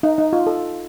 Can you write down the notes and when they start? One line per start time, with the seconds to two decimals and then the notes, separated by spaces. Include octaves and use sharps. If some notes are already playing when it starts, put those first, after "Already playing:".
0.03 D#4
0.18 D#4
0.33 F4
0.47 A4